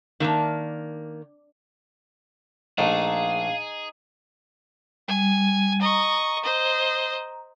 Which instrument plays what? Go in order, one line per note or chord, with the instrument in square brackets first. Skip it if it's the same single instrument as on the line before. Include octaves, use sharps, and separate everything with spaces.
[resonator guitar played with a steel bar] D#3 A#3 [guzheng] D4 E5 F5
[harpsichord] A#1 A3 [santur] D#4 [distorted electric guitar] G#4 [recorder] F5
[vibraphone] G3 [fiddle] G#5
[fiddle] D#5 C#6 [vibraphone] A#5
[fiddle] C5 D#5